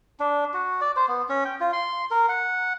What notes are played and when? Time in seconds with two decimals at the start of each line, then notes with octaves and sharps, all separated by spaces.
0.20 D4
0.54 F#4
0.81 D5
0.96 C5
1.08 B3
1.29 C#4
1.45 G5
1.60 F4
1.73 C6
2.11 A#4
2.29 F#5